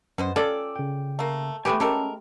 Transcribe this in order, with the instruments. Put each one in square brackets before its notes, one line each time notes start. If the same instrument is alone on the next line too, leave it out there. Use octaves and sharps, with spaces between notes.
[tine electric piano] F#2 [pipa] B2 B3 C5
[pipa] C#4 F4 D5 [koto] A4 [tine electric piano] G5 D6 E6
[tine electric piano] C#3 G5
[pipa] A3 A#3
[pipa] C3 B4 G#5 [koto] A3 B3 G4
[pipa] G#3 A4 A#4 [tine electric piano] C#4 [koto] G4